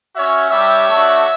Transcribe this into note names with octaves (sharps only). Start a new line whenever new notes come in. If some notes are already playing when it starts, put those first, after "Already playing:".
C#4 F#4 C#5 E5
G3 D4 G4 C#5 E5
A3 D4 F#4